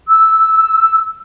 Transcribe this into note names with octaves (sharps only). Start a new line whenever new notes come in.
E6